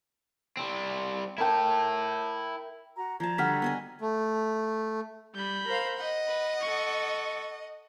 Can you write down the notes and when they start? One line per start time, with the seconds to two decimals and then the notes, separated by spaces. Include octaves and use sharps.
0.57 G3 C4
1.38 E4 A#4 G5 A5
2.96 F#4 A#5
3.20 F3 D5 A5 A#5 G#6
3.38 D3 G3 F#4 F#5 F6 B6
3.62 B3 D#5 G#5
4.01 A3
5.35 G3 B5 G6
5.67 A#4 C5 F5
5.97 D#5 F#5
6.27 B4
6.61 A4 C#6